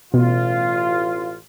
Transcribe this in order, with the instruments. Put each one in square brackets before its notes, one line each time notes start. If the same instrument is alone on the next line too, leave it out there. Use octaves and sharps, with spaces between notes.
[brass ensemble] A1 F4 [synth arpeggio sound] B2